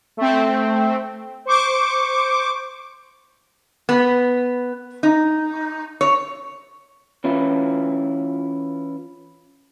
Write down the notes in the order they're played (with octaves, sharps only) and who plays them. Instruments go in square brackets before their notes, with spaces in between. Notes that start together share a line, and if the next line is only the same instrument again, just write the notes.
[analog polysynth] A3 C4
C5 C#6 D6
[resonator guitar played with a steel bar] B3
D#4
C#5
[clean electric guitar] E3 C#4 E4 F4